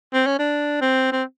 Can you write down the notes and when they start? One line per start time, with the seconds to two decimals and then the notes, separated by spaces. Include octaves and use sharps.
0.14 C4
0.27 C#4
0.39 D4
0.81 C4
1.12 C4